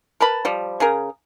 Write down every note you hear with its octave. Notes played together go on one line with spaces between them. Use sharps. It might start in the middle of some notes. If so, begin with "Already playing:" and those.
A#4 B4 A5 B5
F3 G3
C#3 G#4 A#4